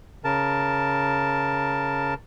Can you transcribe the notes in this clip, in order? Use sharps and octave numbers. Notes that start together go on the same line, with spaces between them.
C#3 A#4 A5